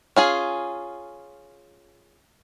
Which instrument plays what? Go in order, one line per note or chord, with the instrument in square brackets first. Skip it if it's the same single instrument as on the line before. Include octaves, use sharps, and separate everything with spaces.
[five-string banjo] C#4 F4 G#4